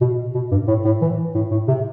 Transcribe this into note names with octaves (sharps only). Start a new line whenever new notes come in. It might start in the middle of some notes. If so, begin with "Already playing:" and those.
B2
B2
G2
A2
A2
E3
A2
A2
C3